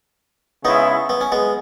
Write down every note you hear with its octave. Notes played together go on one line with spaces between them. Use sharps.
C#3 G#3 B3 C#4 D#4 E4
B3
C#4
G#3 B3